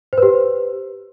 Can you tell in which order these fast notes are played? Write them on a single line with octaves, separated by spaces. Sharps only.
C5 B4 G4